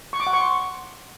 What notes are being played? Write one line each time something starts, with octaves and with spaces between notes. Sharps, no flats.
C#6
D6
F#5
C#6
C6